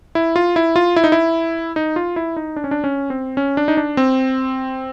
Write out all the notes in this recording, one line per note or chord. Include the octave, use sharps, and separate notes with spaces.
E4
F4
E4
F4
E4
D#4
E4
D#4
F4
E4
D#4
D4
C#4
D4
C#4
C4
C#4
D4
D#4
D4
C4